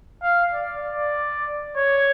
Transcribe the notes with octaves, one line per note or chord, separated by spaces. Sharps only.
F5
D5
D5
C#5